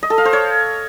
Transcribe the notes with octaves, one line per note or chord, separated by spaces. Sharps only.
D#5
A4
F5
C5
C#5